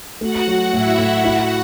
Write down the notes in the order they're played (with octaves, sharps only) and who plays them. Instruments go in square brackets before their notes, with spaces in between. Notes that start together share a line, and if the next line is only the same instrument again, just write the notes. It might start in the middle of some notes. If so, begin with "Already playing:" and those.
[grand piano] A3 [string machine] F#4 F#5
[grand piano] F#3
[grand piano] A2 [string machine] E4 E5
[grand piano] A2
[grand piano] E4 [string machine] F#4 F#5